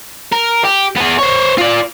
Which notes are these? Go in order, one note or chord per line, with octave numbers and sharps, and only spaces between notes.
A#4
G4
B3 G#4
C5 C#5
F4 D5